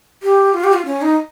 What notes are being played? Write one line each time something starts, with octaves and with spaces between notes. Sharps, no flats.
G4
F4
G4
F4
C#4
D#4